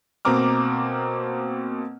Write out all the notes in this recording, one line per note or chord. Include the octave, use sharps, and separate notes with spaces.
B2 A#3 C4 A#5 D6 F6